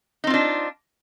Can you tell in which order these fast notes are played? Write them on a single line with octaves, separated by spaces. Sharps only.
D#4 C4 F4 D4